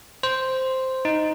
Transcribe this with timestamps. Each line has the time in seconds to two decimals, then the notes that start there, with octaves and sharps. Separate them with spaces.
0.23 C5
1.05 D#4